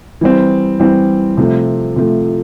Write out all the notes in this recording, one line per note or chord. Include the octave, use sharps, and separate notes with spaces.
E3 G3 C4
E3 G3 C4
C3 F3 A3
C3 F3 A3